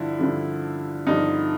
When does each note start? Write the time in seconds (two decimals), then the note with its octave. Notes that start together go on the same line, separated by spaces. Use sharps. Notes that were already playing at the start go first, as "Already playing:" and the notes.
Already playing: G2 D3 F3 E4
0.19 G2 D3 F3
1.07 G2 D3 F3 D#4